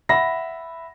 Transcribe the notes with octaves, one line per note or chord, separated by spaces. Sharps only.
E5 F#5 B5 A#6